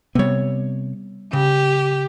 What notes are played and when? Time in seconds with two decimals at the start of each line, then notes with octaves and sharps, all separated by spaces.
0.15 C3 G3 B3 C#5
1.33 C#3 G4